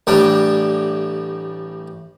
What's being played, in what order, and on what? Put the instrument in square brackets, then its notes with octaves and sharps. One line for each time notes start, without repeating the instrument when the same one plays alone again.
[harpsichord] A1 A2 G3 D4